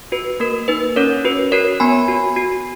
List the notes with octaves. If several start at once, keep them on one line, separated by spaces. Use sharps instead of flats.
F#4 B4
A#3 A#4
D#4 B4
C#4 A#4 C#5
F#4 B4
F#4 A#4 C#5
B3 G#5 B5
F#4
F#4